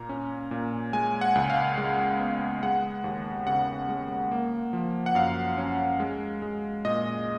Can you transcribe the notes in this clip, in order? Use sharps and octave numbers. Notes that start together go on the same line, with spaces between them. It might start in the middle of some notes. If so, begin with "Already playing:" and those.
Already playing: A#2 A#3 A#5
C#4
A#2
G#3 G#5
F#5
C#2
F5
G#3
B3
G#3 F#5
D#2
C#3 F#5
G#3
A#3
F3
F#5
F#2 F5
C#4
G#3
G#3
A#2 D#5